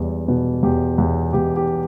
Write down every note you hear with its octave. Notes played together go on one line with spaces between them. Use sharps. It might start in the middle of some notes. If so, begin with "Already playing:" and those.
Already playing: E2 G3
B2
E2 G4
E2
E2 G4
G4